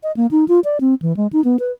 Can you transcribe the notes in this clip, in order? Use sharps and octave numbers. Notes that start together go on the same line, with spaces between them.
D#5
A#3
D#4
F4
D5
C4
E3
G#3
D#4
B3
B4